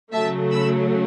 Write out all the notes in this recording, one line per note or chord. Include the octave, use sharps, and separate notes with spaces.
C#3 F#3 A3 E5 A5
B5 E6